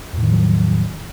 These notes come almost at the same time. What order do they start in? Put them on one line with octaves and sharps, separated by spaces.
E2 A2 D#3 F3 F#3